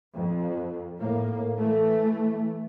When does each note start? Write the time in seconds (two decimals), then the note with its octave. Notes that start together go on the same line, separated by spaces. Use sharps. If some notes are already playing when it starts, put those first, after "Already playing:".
0.15 F2
1.00 A2 A#3
1.59 E3 A3